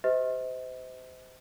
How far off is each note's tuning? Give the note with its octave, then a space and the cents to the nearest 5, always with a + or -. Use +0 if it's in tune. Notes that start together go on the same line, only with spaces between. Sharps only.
G4 +0 C5 -30 D#5 +40